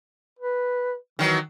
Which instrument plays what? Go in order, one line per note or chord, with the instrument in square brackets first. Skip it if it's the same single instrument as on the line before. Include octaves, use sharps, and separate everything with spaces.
[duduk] B4
[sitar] D#3 F#3 [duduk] E3